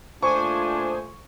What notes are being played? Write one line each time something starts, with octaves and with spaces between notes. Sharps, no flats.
A#2 A3 D4 F4 C5 G#5 C#6 D#6